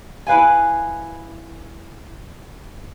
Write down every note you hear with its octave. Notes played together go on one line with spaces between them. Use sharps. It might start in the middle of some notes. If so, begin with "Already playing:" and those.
E4 B4 F5 G#5